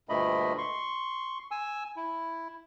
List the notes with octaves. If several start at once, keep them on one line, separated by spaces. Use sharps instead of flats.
D2 G2 A#2 A3 D#5 B5
C6 C#6
G#5 E6
E4